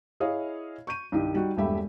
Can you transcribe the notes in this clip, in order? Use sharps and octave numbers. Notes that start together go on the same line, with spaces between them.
E4 G#4 C#5 D#5 F5
C#6 G6 D#7
C2 G2 D#3 D#4 G4
G3 D#4 F#4
E1 G2 A3 G4 E5 B5